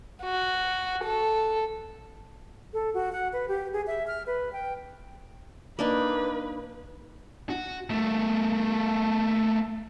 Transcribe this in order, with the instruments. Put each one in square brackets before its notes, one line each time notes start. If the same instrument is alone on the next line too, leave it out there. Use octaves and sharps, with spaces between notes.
[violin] F#4
A4
[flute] A4
F#4
F#5
B4
G4
G#4
E5
F6
B4
G5
[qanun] A#3 D4 D#4 [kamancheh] B4
[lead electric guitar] F#4
A3 A#3